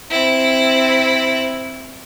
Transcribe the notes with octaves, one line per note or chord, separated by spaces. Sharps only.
C4 E4